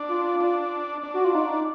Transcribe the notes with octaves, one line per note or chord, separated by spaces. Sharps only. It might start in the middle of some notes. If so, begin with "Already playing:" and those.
Already playing: D4
F4
D4
D4
F#4
F4
D#4